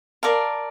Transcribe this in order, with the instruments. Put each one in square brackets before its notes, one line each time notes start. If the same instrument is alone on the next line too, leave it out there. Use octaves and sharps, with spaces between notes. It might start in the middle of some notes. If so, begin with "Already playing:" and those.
[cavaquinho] A#4 D5 F5 A5